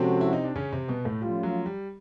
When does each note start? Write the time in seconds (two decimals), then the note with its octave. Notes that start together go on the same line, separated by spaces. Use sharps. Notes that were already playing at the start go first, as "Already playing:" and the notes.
Already playing: C3 F3 G#3 C4 C#4 F#4 A4
0.21 E4
0.33 D#4
0.44 D4
0.56 C#3 C#4
0.73 C3 C4
0.88 B2 B3
1.05 A2 A3
1.22 F3 G3 A3 C#4 F4
1.43 F#3
1.66 G3